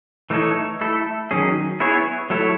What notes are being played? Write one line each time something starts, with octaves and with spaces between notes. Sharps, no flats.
E3 A3 D#4 A4 C#5
A3 E4 A4
D#3 F#3 C#4 G#4
B3 E4 G#4 C#5
F#3 A3 E4 A4 C#5